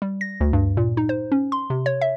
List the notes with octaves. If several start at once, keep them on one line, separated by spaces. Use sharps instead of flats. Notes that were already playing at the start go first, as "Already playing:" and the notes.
G3
A#6
D2
G2
A#2
D#4
C5
C#4
C6
C3
C#5
E5